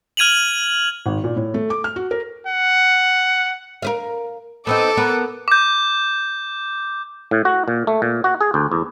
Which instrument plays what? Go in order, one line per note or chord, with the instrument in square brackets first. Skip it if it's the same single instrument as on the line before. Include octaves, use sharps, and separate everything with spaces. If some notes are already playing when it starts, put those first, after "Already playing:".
[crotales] F6 G#6 D#7 F7 F#7
[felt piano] G#1
A#2
A2
A3
D6
F6
F#4
A#4
[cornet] F#5
[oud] A#4 B4 F5
[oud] B3 C4 D#4 [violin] A4 D6
[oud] B3 A#4 B4
[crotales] D6 G6
[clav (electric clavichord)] A2
F#4
A#2
A3
A#2
F#4
G#4
D2
E2